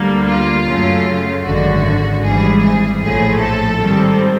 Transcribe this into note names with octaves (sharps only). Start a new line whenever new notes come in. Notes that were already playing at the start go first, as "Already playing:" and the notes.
Already playing: D2 D3 G3 A#3
F4
F#2 C#3 F#3 A3
G#1 F#2 D3 F#4
G#1 G#2 E3 G3 G#4
G#4
A#1 A2 F3 A3 G#4
A4
G#2 D#3 G3 C4